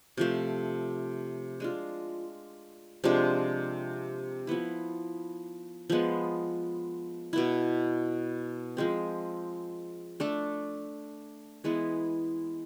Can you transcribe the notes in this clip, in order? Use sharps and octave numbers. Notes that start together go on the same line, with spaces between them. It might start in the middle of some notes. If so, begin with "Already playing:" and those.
C3 F3 A3
G#3 D4 F4
C3 F3 G#3 D4
F3 B3 E4
F3 G#3 B3
B2 B3 E4
F3 G#3 C4
A3 D4 A4
E3 G#3 B3 E4